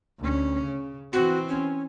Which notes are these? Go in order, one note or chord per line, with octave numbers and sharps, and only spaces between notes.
D2 C#4
C#3
E3 C4 F#4
C#4